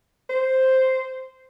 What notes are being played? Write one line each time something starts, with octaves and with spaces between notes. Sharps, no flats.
C5